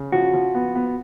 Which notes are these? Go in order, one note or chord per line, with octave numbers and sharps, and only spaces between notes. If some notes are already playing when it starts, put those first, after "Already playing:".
Already playing: C#3
F3 F#4
F3
B3
B3